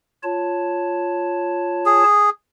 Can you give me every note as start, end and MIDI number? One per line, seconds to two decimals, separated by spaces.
0.23 2.03 65
0.23 2.03 73
0.23 2.03 81
1.86 2.30 68